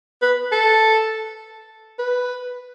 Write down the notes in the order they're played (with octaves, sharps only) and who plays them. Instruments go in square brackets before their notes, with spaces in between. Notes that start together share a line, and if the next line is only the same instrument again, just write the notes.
[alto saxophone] B4
A4
B4